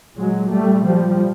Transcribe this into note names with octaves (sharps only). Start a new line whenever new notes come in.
A#2 F#3 G#3
G3 A3
F3 G3